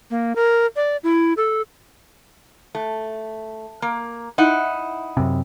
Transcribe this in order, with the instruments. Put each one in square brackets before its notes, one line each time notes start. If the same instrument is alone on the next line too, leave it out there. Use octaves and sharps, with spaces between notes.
[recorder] A#3
A#4
D5
E4
A4
[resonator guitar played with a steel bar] A3
A#3
D#4 E4 F#5
[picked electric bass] F#2 C3